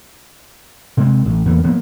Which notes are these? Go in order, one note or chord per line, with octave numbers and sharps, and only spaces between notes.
C3 G#3 C4
A1
E2 E3 A3 A#3
F3 F#3 A#3 B3